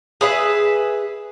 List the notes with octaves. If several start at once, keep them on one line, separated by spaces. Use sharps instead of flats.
G#4 B4 E5